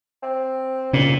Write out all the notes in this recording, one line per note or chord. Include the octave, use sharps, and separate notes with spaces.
C4
A#2 C#3